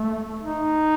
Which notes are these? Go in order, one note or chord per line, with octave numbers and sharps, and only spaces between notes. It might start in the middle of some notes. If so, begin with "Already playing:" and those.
Already playing: A3
D#4